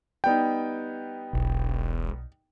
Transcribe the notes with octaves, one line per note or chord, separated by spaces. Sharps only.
G3 B3 D#4 G5
E1 B1